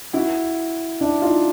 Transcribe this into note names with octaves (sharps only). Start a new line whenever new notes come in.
E4 F#4
D4 E4
D#4 F4